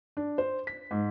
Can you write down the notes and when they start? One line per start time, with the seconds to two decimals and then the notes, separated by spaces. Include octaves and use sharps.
0.17 D4
0.38 C5
0.67 B6
0.91 G#2